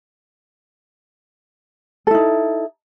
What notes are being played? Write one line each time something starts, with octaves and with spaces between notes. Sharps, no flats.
D#4 E4 A4